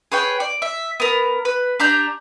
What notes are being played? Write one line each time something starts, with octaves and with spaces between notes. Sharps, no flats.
G#4 B4 C#5 G5
D5
E5
B3 A#4
B4
D4 G4 A#5 G6